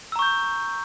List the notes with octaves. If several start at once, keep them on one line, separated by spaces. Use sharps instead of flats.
A#5 C#6 E6 G6